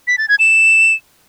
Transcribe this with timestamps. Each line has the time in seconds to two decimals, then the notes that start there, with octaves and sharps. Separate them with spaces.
0.07 B6
0.18 A6
0.29 G#6
0.39 E7